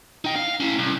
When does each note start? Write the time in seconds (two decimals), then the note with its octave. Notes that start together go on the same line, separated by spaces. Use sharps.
0.25 D#4 G5
0.36 F5
0.60 C#4 E4
0.79 C2